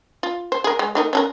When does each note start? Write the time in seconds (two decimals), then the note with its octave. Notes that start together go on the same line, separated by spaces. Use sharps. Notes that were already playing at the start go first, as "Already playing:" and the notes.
0.23 F4
0.52 C5
0.64 G#4 A#4
0.79 G#3
0.95 A3 D#4 A#4
1.13 C#4 A4 A#4